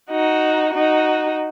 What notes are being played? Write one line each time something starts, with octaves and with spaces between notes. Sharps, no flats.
D#4 F#4
D#4 F#4